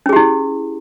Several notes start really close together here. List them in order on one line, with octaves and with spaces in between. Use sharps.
C#4 G#4 G4 E4